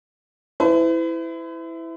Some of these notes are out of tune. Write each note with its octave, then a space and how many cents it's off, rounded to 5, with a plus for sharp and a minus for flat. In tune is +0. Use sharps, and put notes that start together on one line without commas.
E4 +0 B4 +45